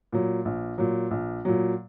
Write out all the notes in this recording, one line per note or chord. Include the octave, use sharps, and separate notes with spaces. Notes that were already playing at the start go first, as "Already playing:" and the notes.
A#2 F#3
A#1
A#2 F#3
A#1
A#2 F#3